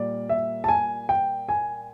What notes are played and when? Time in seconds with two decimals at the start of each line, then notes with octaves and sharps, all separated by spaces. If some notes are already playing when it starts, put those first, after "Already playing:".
Already playing: A#2 G3 A#3 D5
0.29 E5
0.64 A5
0.68 G#5
1.09 G5
1.49 G#5